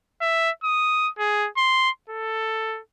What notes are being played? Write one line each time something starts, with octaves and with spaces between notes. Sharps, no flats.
E5
D#6
G#4
C6
A4